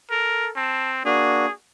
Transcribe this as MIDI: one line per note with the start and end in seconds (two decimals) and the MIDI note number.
0.10 0.51 69
0.10 0.49 70
0.56 1.04 60
0.56 0.90 81
1.05 1.46 58
1.05 1.46 62
1.05 1.46 66
1.05 1.51 68